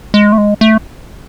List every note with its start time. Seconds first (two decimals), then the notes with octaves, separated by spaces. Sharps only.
0.14 G#3
0.32 A3
0.38 G#3
0.61 A3